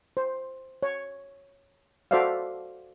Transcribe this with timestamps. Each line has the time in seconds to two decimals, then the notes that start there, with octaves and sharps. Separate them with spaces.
0.17 C5
0.83 C#5
2.11 F#4 A4 C5 D5 E5 F5